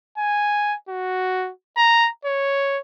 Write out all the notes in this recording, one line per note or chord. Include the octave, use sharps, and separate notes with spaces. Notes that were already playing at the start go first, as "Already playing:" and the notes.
G#5
F#4
A#5
C#5